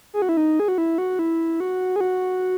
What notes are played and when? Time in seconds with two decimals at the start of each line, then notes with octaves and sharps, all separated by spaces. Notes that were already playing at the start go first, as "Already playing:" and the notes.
0.14 G#4
0.22 F#4
0.29 E4
0.37 D#4
0.60 G#4
0.68 F#4
0.78 E4
0.98 F#4
1.19 E4
1.60 F#4
1.96 G#4
2.01 F#4